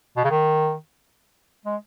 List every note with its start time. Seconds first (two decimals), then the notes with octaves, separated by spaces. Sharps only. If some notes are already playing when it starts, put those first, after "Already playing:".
0.17 B2
0.24 C#3
0.31 D#3
1.66 G#3